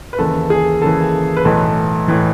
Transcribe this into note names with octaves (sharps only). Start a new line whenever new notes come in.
B4
D#2 C#3 E3 A4
G#4
D#2 C#3 E3 A4
B4
B1 A2 E3 A4
A2 E3